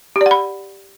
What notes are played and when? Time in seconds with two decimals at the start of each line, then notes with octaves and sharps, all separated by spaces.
0.16 G4
0.21 D5
0.26 F#5
0.31 B5